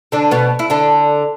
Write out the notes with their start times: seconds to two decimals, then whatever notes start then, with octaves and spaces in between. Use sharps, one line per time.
0.12 D3 D4
0.31 B2 B3
0.59 E4
0.70 D3 D4